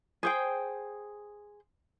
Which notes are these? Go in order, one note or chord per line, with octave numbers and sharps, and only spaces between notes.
G#4 C5 G5